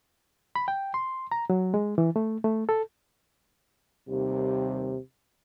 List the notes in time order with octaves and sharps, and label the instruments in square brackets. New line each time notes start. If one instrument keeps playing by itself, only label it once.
[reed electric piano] B5
G5
C6
A#5
F#3
G#3
E3
A3
A3
A4
[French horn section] D#2 G3 [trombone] C3